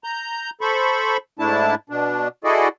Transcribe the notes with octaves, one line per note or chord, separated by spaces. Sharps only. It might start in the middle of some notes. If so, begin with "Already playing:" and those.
A#5 G6
A4 C5 B5 C#6
G#2 A3 D4 E4 A5
B2 D4
E4 F#4 G#4 A4 D5 D#5